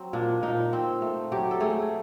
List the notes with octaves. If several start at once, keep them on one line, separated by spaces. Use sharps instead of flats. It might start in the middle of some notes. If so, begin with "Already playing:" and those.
Already playing: F#3 C4
A#2 D4
A#2 D#4
C4
A3
F#3 G4
A4
A3 G#4